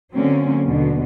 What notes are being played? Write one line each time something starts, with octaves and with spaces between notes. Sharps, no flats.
D3 F#3 A#3 C4 C#4
D#2 B2 D3